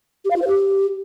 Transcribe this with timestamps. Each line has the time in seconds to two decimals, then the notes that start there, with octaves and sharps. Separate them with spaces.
0.24 G4
0.30 F5
0.36 F4
0.41 C5
0.47 G4